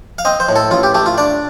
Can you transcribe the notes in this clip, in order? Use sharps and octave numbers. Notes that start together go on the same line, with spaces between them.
F5
C4 D#5
C5
A2
A4
A1 F4
G4
A3 G4
F4
D4 D5